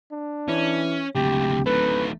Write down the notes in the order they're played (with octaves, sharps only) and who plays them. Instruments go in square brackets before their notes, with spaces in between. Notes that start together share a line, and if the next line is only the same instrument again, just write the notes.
[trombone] D4
[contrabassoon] E3 [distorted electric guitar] C#4
[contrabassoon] D1 [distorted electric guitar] C#2 A3 [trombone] G4
[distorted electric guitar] D#3 A3 [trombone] B4